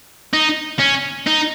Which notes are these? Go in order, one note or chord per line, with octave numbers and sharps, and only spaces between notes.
D#4
C#4
D#4